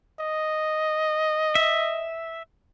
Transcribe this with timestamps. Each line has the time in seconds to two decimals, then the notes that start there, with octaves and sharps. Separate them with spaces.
0.20 D#5
1.55 E5